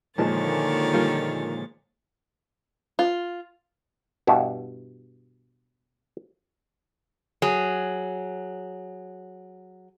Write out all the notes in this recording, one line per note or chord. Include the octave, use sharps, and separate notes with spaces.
A#2 D3 D#3 F3 G#3 C#5 A5 A6
G3 A#3 F4
F4
G2 B2 E4
F#3 G#4